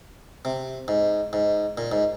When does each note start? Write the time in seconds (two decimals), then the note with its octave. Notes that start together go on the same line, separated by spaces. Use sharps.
0.45 C3
0.88 G#2
1.33 G#2
1.78 A#2
1.92 G#2